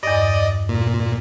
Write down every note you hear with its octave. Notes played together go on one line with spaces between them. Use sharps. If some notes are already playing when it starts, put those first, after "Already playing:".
E2 G2 D5 D#5
A#2